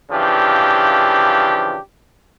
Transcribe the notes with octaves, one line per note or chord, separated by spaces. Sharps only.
C#3 E3 F3 D4 G4